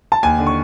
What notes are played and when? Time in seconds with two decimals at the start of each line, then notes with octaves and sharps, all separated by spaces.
0.12 A5
0.23 D#2 G#5
0.39 D3
0.47 C#6